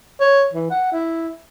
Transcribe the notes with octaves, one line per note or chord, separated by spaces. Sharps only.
C#5
E3
F#5
E4